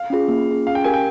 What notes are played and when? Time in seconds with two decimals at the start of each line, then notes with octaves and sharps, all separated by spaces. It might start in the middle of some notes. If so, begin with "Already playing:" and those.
Already playing: F5
0.10 C#4 F4 G#4
0.28 A#3
0.47 C#4 F4 G#4
0.67 C#4 F5
0.75 G5
0.84 G4 A#4 G#5
0.94 G5